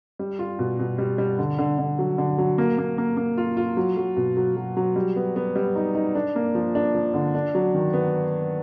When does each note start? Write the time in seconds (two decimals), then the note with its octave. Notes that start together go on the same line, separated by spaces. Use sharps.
0.19 G3
0.39 F4
0.59 B2
0.79 B2
0.98 G3
1.18 G3
1.38 D3
1.59 D3
1.78 D3
1.99 F#3
2.18 D3
2.38 F#3
2.58 A#3
2.78 A#3
2.98 A#3
3.17 A#3
3.38 F4
3.57 F4
3.77 F#3
3.97 F#3
4.17 B2
4.37 F#3
4.57 F#3
4.77 F#3
4.96 G3
5.16 B3
5.36 B3
5.56 G3
5.75 D#4
5.95 D#4
6.15 D4
6.36 A#3
6.55 F3
6.75 D4
6.95 F3
7.14 D3
7.35 D4
7.55 F#3
7.75 D#3
7.93 B3